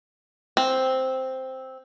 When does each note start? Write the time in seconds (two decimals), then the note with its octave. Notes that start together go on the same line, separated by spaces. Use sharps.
0.57 C4